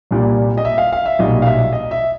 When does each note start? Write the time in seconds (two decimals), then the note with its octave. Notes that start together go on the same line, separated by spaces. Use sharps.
0.11 C2 A#2 G3
0.58 D#5
0.65 E5
0.78 F5
0.92 F5
1.06 E5
1.19 B1 A#2 G3 D#5
1.42 F5
1.46 E5
1.73 D#5
1.91 E5